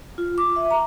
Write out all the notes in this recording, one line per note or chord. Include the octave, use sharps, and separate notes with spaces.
F4
D6
E5
A#5